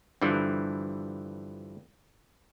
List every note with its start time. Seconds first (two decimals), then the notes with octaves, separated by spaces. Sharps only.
0.22 G2 D3 E3 F3